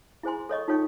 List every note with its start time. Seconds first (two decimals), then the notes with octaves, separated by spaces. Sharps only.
0.23 E4 G#4 C5 G#5 C6
0.49 A4 C#5 D#5 C#6
0.68 D#4 F4 A4 C#5 G5 C#6